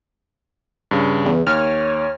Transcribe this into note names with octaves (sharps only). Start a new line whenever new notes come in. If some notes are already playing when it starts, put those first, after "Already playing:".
G2 C#3
E2
D#2 C#5 F6